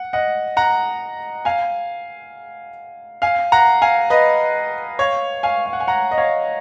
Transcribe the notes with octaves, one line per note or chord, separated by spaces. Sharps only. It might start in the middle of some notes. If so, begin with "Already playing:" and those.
Already playing: F#5
D#5 F#5
F#5 A#5
F5 G#5
F5 G#5
F#5 A#5
F5 G#5
B4 D#5
C#5 F5
F5 G#5
F5
F#5
G#5
F#5 A#5
D#5
C#5 F5